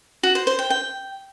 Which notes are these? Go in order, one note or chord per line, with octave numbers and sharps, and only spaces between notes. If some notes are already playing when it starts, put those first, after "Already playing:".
F#4
C5
C5
G5
G5